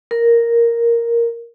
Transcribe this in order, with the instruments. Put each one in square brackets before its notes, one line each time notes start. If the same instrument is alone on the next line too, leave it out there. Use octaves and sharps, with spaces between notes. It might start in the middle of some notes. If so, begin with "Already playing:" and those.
[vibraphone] A#4